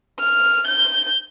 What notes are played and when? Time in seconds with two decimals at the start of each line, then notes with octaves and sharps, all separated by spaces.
0.20 F6
0.67 G6